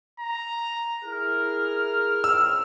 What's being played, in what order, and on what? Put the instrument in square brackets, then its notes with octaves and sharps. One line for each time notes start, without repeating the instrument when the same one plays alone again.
[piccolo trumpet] A#5
[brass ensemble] E4 G#4 A#4 [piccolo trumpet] F6
[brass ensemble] C#2 C4 [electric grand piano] E6